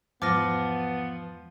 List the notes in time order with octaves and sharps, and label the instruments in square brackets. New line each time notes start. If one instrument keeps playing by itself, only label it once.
[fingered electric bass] E2 G#2 [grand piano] F3 [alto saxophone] B3 [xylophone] D6 F6 A#6